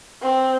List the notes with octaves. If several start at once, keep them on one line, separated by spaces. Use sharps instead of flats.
C4